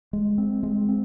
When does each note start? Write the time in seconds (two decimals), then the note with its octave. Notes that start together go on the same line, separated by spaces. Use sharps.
0.13 G#3
0.38 C4
0.63 G#3
0.89 C4